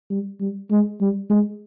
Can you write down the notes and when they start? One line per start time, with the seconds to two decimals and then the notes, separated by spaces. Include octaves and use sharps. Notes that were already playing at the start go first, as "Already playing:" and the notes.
0.10 G3
0.41 G3
0.71 G#3
1.01 G3
1.30 G#3